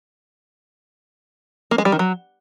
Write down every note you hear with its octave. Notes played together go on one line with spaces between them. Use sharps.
A#3
G#3
G3
D#3
F#3